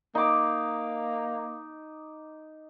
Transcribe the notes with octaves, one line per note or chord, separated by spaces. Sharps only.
A#3 D#4 D6